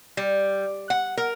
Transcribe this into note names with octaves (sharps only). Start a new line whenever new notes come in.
G3
F#5
A#4